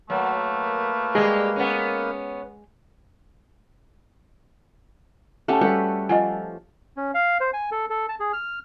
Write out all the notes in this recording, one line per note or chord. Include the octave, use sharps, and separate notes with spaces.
F#3 A3 A#3 A#4 B4
G3 G#3 G4 G#4
B3 C#4
A3 C#4 G4 F#5 A5
G3 F#4 G4 A4 B4 F#5
F3 D#5 F#5 G#5
C#4
F5
C5
G#5
A4
A4
A5
G#4
F6